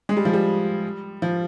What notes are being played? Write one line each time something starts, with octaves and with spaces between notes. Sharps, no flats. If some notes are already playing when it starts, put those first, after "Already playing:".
G#3
G3
F3
G3
F3